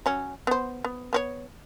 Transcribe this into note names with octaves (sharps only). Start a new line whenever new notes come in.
F#3 C#4
B3 C5
B3
B3 C4 C#5